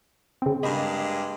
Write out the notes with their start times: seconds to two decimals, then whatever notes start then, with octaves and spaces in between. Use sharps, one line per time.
0.42 C#3 C4
0.63 G2 G#3 A#3 D#5 B5